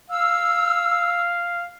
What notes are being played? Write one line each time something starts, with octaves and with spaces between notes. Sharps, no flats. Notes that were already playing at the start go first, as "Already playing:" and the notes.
F5 E6